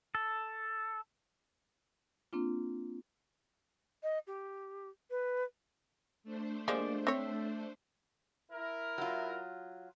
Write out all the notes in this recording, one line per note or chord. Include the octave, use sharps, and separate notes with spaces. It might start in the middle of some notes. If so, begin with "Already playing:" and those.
A4
A#3 C4 D4 F4
D#5
G4
B4
A3 D4 C5
F3 G#3 A#3 G4 D5
C4 C#5 E5
E4 A#4
F#3 F4